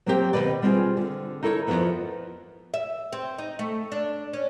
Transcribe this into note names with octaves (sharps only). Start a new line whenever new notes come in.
F#3 A#3 C4 G4 G5
D#2 B2 B4 D5
G3 C4 F4 F#4 G#4
D3
D#4 E4 A4 A#4 C5 C#5
F2 B2 F3 B3 E4
E5
C4
D#4
A3
D4
C#4